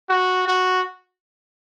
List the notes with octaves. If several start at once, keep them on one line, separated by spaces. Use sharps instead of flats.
F#4
F#4